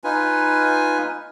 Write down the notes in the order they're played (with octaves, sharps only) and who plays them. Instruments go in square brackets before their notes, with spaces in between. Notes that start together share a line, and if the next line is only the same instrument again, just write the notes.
[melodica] D#4 F4 B4 G#5